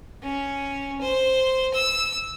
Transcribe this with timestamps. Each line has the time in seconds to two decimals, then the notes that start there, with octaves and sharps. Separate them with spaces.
0.23 C#4
1.01 C5
1.74 E6